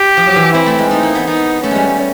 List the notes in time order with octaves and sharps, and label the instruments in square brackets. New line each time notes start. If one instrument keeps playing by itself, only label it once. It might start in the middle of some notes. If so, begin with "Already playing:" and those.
Already playing: [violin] G4
[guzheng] F3
F#3
E3
[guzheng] C4 [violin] E4
[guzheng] A3
G#3
[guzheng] A3 [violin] D#4
[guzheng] A#3
B3
[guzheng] B3 [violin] D#4
[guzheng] A3 [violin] C#4
[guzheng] G3 G#3
G3